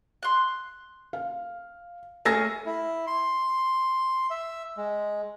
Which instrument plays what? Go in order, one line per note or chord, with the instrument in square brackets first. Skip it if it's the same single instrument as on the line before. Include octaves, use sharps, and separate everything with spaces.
[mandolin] C6 F#6
[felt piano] F5
[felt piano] A3 E6 A#6 [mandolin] C#4 G#4
[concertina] E4
C6
E5
G#3